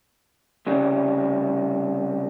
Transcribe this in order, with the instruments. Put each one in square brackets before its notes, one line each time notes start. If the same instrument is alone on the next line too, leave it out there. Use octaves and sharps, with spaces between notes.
[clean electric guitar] C2 C#3 G3